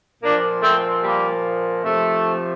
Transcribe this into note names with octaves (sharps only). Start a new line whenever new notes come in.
A#2 F3 A#3 D4
A3 C4
G3 A#3
C3 F3 A3